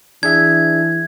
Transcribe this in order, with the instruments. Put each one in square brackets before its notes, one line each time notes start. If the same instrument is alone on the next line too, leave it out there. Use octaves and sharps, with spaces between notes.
[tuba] E3 [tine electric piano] D4 G#4 E5 [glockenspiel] G#6